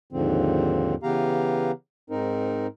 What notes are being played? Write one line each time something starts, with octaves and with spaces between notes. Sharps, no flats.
D#2 G#2 D3 F3 C4
C#3 E3 B3 G4 F5 A#5
G#2 C4 D#4 A#4